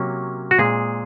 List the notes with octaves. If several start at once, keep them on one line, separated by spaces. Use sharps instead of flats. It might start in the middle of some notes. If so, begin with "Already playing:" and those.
Already playing: C3 F#3 A#3 C#4
F#4
A#2 G#3 C4 G#4